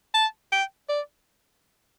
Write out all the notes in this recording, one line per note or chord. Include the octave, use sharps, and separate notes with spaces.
A5
G5
D5